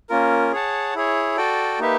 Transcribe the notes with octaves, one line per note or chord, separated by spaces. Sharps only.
A#3 C#4 F4 A#4
G#4 C#5 F#5 A5
E4 G#4 C#5
F#4 A4 D5 G5
A#3 D#4 G4 B4 E5